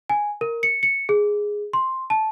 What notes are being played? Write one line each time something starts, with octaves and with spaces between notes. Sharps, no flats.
G#5
A#4
C#7
C#7
G#4
C6
A5